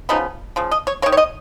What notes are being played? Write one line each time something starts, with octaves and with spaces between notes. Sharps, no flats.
C#3 F3 B3 D#4
C#3 F3
D#5
C#5
A#3 C#5
D#3
C#5
D#5